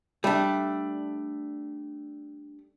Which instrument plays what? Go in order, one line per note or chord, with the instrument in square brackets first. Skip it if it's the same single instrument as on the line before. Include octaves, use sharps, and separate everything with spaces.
[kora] G3 [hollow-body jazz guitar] A3 D4